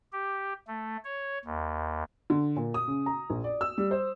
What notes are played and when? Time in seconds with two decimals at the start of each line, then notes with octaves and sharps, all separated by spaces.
0.12 G4
0.67 A3
1.04 C#5
1.45 D#2
2.30 D3
2.56 A#2
2.74 D#6
2.88 C#3
3.06 A#5
3.30 A#1
3.44 D5
3.61 E6
3.78 G3
3.91 C5